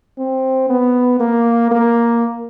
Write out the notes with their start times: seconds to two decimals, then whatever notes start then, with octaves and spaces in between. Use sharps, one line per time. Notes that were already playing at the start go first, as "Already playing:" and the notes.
0.18 C4
0.69 B3
1.20 A#3
1.71 A#3